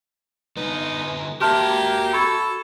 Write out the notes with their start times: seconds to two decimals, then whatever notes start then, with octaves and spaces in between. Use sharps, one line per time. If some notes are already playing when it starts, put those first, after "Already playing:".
0.57 D3 B3 D#4 B4
1.41 A#3 F#4 G4 E5 A5 C6 F6
2.13 A4 B5 C#6 G#6